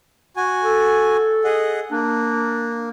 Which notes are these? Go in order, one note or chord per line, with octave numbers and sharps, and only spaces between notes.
F#4 G#5
A4
G#4 D#5 F#5
A#3 D4